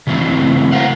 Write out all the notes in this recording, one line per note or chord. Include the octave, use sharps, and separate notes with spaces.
C#3 E3 F#3 A3 C4
A#4 C5 F5 F#5